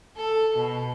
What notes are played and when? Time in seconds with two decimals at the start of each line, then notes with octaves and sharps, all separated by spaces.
0.16 A4
0.57 B2